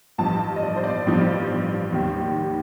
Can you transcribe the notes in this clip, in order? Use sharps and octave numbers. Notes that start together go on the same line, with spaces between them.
A1 G2 F3 A5
D#5
D5
C5
D5
A1 G2 F3
D#2 D#3 G3